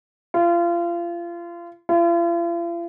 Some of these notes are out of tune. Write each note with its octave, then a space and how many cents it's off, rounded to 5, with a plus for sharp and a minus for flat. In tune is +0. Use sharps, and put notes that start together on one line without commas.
F4 -30
F4 -45